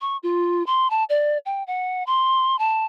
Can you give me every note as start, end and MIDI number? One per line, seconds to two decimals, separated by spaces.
0.01 0.17 85
0.23 0.65 65
0.66 0.90 84
0.90 1.04 81
1.09 1.38 74
1.46 1.63 79
1.67 2.03 78
2.06 2.58 84
2.59 2.85 81